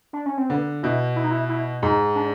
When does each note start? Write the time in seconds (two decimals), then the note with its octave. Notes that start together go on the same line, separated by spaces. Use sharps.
0.13 D4
0.26 C#4
0.37 C4
0.49 D3 B3
0.83 B2 E4
1.16 E4
1.23 D#4
1.31 E4
1.49 E4
1.82 G#2 D#4
2.16 D4